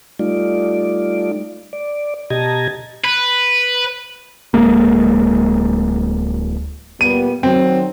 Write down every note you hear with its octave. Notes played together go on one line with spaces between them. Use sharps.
G3 A3 D#4 F4 D5
D5
B2 G4 D#5 A5 A#5 G#6
B4
D1 G#3 A#3
A#2 G3 B3 D#7
D#3 F#3 C4